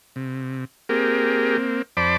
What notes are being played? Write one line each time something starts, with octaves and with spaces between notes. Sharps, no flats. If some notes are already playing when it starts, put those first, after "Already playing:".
C3
A#3 C4 G4 G#4 A#4
A#3 C4
F2 C5 D5 A5 B5 D6